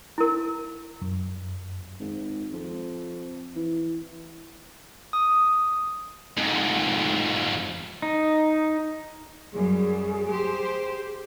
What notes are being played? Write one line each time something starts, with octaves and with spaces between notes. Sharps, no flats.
E4 A#4
F#2
G#1
F2
E3
D#6
F2 G#2
D#4
F#2 G3 G#4
G4 C5